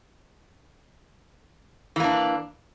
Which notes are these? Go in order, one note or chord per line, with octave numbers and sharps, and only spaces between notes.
E3 A#3 D4